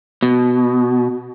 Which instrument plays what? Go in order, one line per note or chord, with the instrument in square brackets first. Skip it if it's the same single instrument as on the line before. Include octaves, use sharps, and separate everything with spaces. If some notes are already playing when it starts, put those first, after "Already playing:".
[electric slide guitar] B2